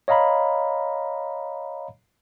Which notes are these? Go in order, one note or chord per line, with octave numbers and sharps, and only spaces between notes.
C#5 D#5 F5 A#5 B5